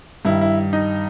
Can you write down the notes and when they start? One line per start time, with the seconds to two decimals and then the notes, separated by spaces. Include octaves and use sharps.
0.25 G2 D#3 E4
0.41 E4
0.73 D#4